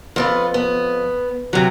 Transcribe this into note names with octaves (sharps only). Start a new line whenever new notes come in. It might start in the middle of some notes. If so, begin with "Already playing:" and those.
F2 B3 F4 B4
B3
C3 F#3